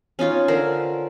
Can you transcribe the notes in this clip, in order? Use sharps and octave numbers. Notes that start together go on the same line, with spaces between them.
C#4 D#4 F4 C#5
D3 A#4 C5